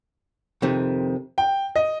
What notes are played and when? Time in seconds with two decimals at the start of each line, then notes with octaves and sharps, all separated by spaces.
0.62 F2 C3 D#3
1.38 G5
1.76 D#5